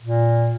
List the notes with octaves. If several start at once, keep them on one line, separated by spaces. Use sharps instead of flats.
A#2